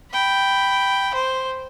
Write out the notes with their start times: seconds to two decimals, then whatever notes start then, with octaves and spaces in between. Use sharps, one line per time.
0.12 G5 B5
1.14 C5